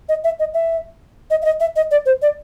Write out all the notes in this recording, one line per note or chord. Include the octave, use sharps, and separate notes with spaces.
D#5
E5
D#5
E5
D#5
E5
D#5
E5
D#5
D5
C5
D5